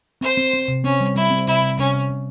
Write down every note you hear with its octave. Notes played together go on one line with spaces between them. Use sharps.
C4 C5
C4
C4
C3
C4 C#4
G3
G3 E4
C4
C3 E4
C3
C3 C#4
C3
C3